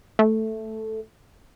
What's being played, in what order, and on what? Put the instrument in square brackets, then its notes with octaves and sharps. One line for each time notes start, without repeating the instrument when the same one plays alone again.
[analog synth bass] A3